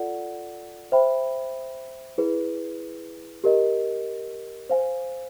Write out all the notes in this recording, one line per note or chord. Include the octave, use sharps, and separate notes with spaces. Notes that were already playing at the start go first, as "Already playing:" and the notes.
Already playing: F4 A4 D5 F#5
C5 E5 G5 B5
E4 G#4 B4
G4 A#4 D#5
C5 F5 G#5